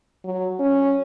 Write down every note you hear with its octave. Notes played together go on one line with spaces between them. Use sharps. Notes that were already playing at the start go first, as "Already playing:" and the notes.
F#3
C#4